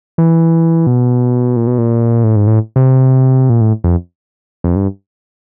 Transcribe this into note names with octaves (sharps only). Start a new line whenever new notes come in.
E3
B2
A#2
B2
A#2
A2
G#2
A2
C3
A#2
A2
F2
F2
G2